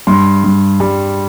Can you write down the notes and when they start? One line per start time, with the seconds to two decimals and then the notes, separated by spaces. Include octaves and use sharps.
0.07 G2 C6
0.44 G2
0.80 G3